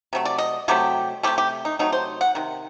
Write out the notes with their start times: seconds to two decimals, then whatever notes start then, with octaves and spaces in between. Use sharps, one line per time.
0.13 C3 F#3 A3
0.25 D5
0.38 D#5
0.68 C3 F#3 A3 G4
1.23 C3 F#3 A3 G4
1.38 G4
1.65 D#4
1.79 C3 F#3 A3 D#4
1.92 C5
2.21 F#5
2.35 C3 D#3